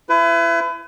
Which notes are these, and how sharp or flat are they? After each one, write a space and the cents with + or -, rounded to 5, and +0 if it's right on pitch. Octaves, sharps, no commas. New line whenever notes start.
E4 +30 B4 +35